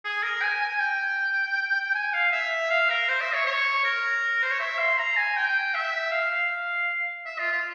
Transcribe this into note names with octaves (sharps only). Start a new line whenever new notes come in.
G#4
A#4
G#5
G#5
G5
G#5
F5
E5
F5
A#4
C5
E5
C#5
C#5
A#4
C5
C#5
E5
C6
A#5
G#5
G5
E5
F5
F5
E5
F4
F4